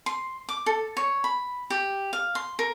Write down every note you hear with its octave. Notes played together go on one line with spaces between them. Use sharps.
C6
D6
A4
C#5
B5
G4
F5
C6
A#4